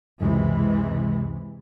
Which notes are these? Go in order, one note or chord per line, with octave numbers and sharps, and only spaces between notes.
C#2 F#2 C3 E3 G#3